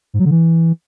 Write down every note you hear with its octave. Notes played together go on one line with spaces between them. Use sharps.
G#2
F#3
D3
E3